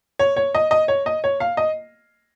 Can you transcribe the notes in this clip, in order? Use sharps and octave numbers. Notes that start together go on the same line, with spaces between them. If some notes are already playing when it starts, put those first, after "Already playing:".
C#5
C#5
D#5
D#5
C#5
D#5
C#5
F5
D#5